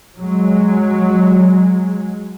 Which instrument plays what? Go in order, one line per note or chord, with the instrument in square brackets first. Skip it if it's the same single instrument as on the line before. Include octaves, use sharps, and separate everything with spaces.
[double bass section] F#3 G#3